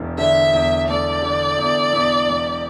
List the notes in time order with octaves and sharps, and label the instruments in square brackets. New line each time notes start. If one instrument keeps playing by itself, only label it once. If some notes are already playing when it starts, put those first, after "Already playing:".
Already playing: [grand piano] E1 E2
[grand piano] D3 [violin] E5
[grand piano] E2
[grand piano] A3 [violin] D5
[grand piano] D3
E2
E2
E1